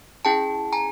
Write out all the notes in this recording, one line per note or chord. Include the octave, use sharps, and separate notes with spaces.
C#4 E4 G#4 G5 A5
G#5 A#5